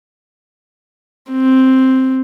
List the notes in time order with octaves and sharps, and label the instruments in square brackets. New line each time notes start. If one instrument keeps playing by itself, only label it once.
[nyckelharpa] C4